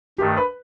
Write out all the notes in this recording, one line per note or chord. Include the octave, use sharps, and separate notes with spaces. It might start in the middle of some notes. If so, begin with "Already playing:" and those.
G2 D#3 A3 G4
B4